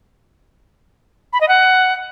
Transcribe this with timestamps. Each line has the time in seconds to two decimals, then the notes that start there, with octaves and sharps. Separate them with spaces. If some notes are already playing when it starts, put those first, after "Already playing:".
1.33 B5
1.41 D#5
1.48 F#5